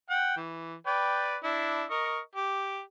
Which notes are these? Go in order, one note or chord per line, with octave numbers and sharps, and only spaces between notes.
F#5 G5
E3
B4 D5 G5
D4 E4
A#4 D#5 C#6
G4